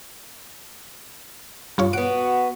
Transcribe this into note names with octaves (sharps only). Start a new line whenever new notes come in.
G2 F4 C#5
B3 F#4 D7